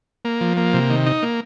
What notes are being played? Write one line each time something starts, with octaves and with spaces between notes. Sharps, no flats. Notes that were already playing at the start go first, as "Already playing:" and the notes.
A#3
F3
A#3
C3
D#3
D#4
A#3